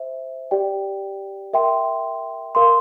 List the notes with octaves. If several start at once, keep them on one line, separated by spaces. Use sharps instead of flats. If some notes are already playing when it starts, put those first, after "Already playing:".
Already playing: C5 E5
G4 D5 G5
A#4 E5 G5 C6
A#4 F5 C6